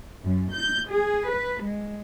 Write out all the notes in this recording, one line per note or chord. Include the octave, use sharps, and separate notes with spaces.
F#2
G6
G#4
B4
G#3